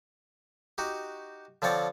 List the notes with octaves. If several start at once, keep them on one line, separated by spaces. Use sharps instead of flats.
D#4 F#4 G4
D3 F3 C4 C#5 D5